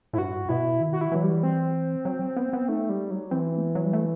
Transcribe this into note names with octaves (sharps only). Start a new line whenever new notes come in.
A2 E4
G2 F#4
B2 E4
D#3
F#4
E4
E3 F#3
G3
C4
F#3
B3
B3
A3 D#4
G3
F#3
E3 C4
A3
B3
F#3
G3
A3